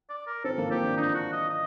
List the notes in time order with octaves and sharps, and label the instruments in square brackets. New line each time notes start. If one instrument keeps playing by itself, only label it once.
[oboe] D5
A#4
[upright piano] C4 [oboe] A4
[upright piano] A#3
[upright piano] C4 [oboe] G4
[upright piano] D4
[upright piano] D4 [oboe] D#4
[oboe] F#4
D#5
D#5